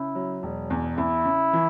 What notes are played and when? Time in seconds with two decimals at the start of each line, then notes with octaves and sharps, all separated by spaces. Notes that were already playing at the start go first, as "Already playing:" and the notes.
Already playing: C#3 E4
0.15 F#3
0.43 E1
0.70 E2
0.98 E2 E4
1.25 C#3
1.53 E3